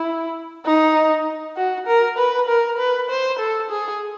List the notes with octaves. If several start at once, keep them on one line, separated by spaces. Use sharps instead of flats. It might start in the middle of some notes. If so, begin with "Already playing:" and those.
Already playing: E4
D#4
F#4
A#4
B4
A#4
B4
C5
A4
G#4